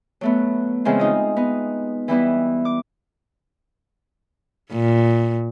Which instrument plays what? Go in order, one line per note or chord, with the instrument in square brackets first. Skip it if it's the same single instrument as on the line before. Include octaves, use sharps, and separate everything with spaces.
[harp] F#3 A3 B3
C#3 E3 F3 G#3 C4
D#4 F4 D#5
B3 D#4
E3 G3 B3 E4
D6
[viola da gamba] A#2